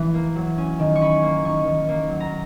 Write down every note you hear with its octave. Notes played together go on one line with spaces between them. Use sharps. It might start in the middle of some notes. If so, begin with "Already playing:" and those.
Already playing: E3
A#3
F#3
C#4
D#3
C#6
C#4 B5
A#3
D#3 C#6
D#3
A#3
F#3
A#5